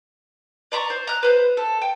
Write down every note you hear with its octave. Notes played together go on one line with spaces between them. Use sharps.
D5 A#5 B5 C#6
C5
A#5 F#6
B4 C5
A4
G5